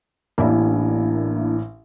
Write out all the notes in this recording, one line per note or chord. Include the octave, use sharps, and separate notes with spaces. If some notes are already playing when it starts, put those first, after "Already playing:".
A1 A#3 D4 E4